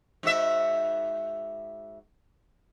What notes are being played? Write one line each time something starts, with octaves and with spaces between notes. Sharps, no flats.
G#2 F#4 E5